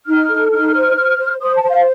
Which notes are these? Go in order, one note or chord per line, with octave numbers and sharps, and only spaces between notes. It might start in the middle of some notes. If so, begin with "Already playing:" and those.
D#4 F6
A4
D#4 F6
C5
C5
C5
C5 D#6
A5
C5
F5